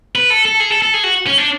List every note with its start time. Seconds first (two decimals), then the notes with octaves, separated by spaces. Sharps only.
0.15 B4
0.30 A4
0.45 A4
0.60 G#4
0.70 A4
0.82 A4
0.94 G#4
1.04 F#4
1.26 C#4
1.38 D4